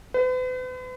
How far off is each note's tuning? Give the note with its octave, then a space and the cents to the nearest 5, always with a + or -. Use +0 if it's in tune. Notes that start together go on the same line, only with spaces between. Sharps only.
B4 +45